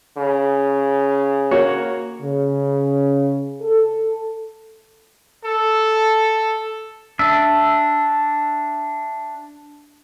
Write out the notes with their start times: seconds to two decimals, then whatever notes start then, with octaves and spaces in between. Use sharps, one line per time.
0.17 C#3
1.51 A#3 F#4 C#5
2.22 C#3
3.62 A4
5.45 A4
7.19 D4 E5